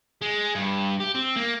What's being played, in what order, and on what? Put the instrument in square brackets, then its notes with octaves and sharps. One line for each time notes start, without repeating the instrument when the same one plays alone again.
[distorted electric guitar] G#3
G2
G4
C4
A#3